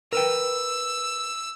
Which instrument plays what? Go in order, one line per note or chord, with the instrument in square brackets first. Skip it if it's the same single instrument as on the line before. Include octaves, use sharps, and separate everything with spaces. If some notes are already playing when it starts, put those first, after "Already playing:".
[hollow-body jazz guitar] A#4 B4 G5 [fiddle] E6